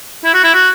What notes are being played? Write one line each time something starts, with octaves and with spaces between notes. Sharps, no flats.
E4
F#4
E4
F#4